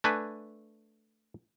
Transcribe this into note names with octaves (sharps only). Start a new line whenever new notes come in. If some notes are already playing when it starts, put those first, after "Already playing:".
A3 D4 B4 G#5